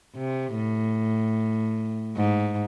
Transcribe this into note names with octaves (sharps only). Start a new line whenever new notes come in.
C3
A2
G#2